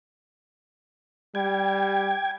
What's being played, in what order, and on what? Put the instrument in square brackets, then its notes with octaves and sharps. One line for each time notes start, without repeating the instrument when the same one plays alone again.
[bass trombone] G3 [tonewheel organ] G5 G#6